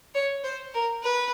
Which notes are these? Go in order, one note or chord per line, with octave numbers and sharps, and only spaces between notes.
C#5
C5
A#4
B4